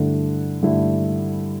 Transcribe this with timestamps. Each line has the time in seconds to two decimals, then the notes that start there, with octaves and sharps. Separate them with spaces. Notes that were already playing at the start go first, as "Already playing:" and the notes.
Already playing: G2 D3 A3 E4
0.63 G2 D3 A3 E4